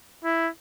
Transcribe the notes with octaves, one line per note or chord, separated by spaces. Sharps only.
E4